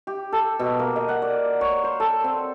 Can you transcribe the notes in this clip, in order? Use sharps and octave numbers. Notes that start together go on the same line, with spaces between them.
G4
A4
B2
A#3
D#5
F#5
D5
C#5
C5
A4
C4